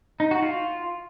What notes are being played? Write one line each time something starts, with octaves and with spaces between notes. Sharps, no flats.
D#4
F#4
F4